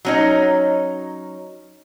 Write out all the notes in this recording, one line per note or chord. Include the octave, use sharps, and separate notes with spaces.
F#3 C#4 D#4